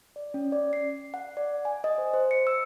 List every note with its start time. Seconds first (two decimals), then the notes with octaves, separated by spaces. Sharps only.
0.16 D5
0.34 C#4
0.52 D5
0.73 C7
1.14 F#5
1.37 D5
1.65 G#5
1.84 D#5
1.98 C5
2.14 C5
2.31 C#7
2.47 E6